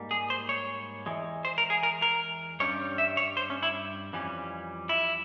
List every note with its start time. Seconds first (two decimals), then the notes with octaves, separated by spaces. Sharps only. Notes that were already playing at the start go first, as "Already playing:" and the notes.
Already playing: G#2 G3 A#3
0.11 G#4
0.30 C5
0.49 C#5
1.06 E2 E3 G#3
1.45 C5
1.58 A#4
1.70 G#4
1.83 A#4
2.02 A#4
2.60 G2 G3 C#4 C#5
2.98 E5
3.17 C#5
3.37 C5
3.50 C#4
3.63 E4
4.13 F2 E3 G3 C#4
4.89 E4